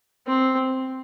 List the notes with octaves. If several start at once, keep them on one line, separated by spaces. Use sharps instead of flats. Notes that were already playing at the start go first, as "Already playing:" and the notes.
C4